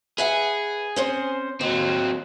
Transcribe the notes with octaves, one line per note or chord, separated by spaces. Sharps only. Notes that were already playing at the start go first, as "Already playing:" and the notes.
G#4 B4 E5 F#5
C4 C#4 C5
D#2 F#3 C4